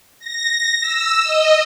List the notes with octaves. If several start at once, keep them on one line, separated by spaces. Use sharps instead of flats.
A#6
E6
D#5